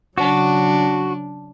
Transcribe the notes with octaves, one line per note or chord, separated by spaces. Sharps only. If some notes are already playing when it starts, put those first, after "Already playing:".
C#3 F#3 D4 F#4